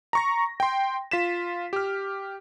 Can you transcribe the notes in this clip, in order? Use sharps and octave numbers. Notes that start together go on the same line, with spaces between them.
A#5 C#6 A#6
G5 C6
F4 B6 E7
G4 F6